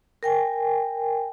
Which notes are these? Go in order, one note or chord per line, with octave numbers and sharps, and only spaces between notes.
A#4 G5 G#5